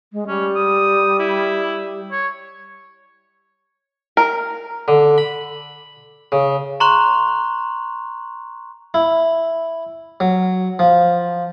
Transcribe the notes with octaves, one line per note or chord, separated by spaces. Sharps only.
G#3
G3 C#4
D#6
E4
C#5
A#4
D3
B5
C#3
A#5 C6 C#6 F#6 F7
E4
F#3
F3